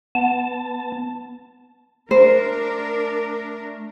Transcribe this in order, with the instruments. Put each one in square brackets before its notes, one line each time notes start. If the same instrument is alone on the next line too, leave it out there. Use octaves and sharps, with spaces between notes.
[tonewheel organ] B3 A5
[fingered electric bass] A3 [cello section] D4 A#4 [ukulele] C5